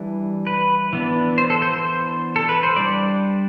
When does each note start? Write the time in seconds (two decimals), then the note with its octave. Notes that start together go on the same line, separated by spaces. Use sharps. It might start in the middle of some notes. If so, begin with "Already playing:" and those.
Already playing: E3 G3 D4
0.47 B4
0.93 E3 B3 D4
1.38 C5
1.50 A4
1.62 C5
1.73 C5
2.36 A4
2.49 B4
2.63 C5
2.76 G3 D4 D5